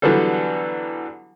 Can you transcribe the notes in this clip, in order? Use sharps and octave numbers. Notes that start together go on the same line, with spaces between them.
D3 E3 F#3 G3 B3 A4